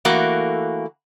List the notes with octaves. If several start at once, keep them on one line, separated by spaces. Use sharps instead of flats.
E3 A3 A#3 F#4